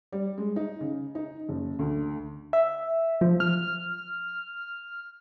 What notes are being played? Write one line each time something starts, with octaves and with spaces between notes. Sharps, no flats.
G3
G#3
D#4
C#3
D#4
F#1
D2
E5
F3
F6